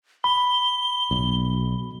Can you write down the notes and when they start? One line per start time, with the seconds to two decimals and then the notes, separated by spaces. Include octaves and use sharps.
0.24 B5 G7
1.11 B1